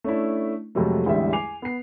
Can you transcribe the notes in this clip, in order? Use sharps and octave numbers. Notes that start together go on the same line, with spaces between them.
A3 C#4 D4 E4
F2 C3 F#3 G#3 A3
A1 E2 D3 G3 G#3 E5
G#5 D6 C7 F7
B3 C7